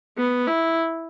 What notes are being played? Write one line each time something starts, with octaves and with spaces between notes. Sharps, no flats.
B3
E4